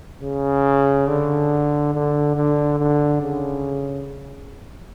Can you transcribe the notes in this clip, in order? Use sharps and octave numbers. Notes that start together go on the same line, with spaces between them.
C#3
D3
D3
D3
D3
C#3